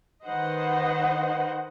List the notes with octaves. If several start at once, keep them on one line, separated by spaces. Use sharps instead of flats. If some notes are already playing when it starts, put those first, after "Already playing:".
D#3 B4 C5 D#5 F#5